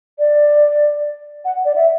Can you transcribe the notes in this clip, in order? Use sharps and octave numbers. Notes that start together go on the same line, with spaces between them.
D5
F#5
D5
E5